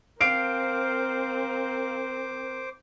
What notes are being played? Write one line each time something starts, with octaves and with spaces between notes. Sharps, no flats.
C4 A#4 C5 F5 D6 D7